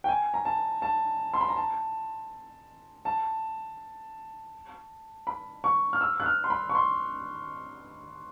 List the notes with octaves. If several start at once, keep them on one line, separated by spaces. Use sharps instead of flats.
G5
G#5
A#5
A5
A5
C6
B5
A#5
A5
A5
B5
C#6
F6
E6
F#6
F6
C6
B5
C#6
C6